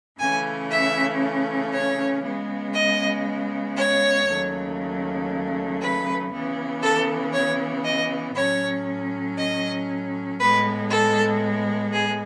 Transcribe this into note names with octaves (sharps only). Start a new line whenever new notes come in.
C#3 E3 A3 C#4 G#5
E5
C#5
C#3 G#3 B3
D#5
C#5
D#2 C#3 F#3 A3
B4
C#3 E3 B3
A4
C#5
D#5
A2 F#3 C#4 C#5
D#5
A2 G#3 B3 B4
A4
G#4